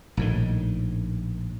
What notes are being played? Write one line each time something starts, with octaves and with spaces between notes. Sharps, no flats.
A#1 A2 D#3